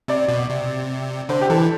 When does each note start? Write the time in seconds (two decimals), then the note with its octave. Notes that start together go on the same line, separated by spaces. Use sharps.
0.08 C3 D5
0.28 B2
0.50 C3
1.29 D3 C5
1.41 G4
1.50 E3 A4